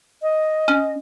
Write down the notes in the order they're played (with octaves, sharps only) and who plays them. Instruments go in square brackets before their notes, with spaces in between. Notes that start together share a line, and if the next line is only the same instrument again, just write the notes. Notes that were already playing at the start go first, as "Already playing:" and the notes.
[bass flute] D#5
[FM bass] C#4